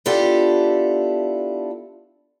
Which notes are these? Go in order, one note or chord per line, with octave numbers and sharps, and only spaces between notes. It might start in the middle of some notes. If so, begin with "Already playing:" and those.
B3 D4 E4 F4 G4 A4